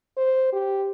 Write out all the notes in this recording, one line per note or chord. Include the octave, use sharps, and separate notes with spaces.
C5
G4